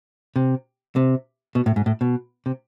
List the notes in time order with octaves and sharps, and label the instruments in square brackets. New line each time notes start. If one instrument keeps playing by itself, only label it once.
[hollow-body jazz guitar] C3
C3
B2
A2
G#2
A2
B2
C3